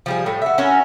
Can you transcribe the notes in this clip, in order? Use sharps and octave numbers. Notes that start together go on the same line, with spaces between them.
F3 G3 G#4
A2 G3
F#4 E5
C#4 E4 F#4 A#4